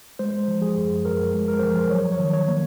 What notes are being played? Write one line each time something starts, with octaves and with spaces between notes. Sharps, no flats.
G#3 C5
F3
G#4
F#2
F#2 A#4
G#3
A#4
F3 C5
A#4
F#3 C#5
C#5
D#3
C#5
A#3